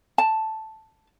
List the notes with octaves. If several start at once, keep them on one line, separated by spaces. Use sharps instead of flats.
A5